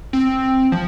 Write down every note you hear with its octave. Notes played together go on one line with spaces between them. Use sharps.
C4
F3